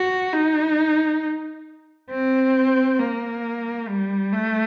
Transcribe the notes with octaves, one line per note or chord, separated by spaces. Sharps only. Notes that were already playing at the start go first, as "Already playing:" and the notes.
Already playing: F#4
D#4
C4
A#3
G3
A3